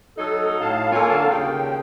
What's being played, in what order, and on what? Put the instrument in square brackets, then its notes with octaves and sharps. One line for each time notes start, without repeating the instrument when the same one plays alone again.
[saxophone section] F#3 D#4 [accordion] A4
[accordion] A2 F5 A5
[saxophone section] A#3 F4 C#5 [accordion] A4 G#5
[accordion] D3 F5 A5
[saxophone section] D#2 C#3 [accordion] G5